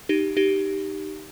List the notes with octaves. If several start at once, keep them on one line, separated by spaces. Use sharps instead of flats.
D#4 G4
D#4 G4